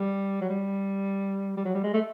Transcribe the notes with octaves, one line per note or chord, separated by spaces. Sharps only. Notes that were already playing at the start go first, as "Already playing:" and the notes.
Already playing: G3
F#3
G3
G3
F#3
G3
G#3
A3